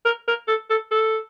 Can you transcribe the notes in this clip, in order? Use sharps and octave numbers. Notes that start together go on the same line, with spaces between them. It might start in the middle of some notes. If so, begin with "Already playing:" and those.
A#4
A#4
A4
A4
A4